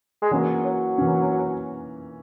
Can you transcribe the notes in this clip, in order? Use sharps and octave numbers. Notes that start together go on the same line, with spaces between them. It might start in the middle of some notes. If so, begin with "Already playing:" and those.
G#3
E3 F#3 A#3 C#4
F#3
E3 A#3 C#4